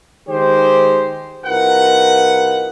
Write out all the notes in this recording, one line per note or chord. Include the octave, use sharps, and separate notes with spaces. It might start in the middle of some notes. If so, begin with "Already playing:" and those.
D#3 G#3 G4 C5
C2 D#4 F4 A#4 B4 F#5